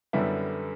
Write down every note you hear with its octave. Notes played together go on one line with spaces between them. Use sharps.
F#2 D3 G3 B3 E4